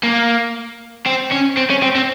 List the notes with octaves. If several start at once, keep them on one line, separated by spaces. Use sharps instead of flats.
A#3
C4
C#4
C4
C#4
C4
C4